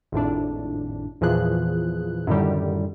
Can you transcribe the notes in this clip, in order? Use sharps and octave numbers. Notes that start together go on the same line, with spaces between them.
G#1 F2 A2 D4
E2 A#2 E3 F3 G#4 F#6
F#2 A2 D3 D#3 G3